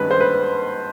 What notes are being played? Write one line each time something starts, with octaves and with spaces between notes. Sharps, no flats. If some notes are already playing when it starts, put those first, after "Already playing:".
Already playing: G#1 G2 D#3 G#3 C#4 B4
C5
B4